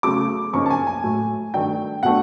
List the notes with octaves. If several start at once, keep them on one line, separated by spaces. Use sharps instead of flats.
C#3 F#3 A3 D6
F#2 C#3 F3 A#3 D#4 C#6
A5
G#5
G#5
A2 F#3 A3
G2 D#3 F#3 A3 D4 G5
B2 F#3 A3 D4 F#5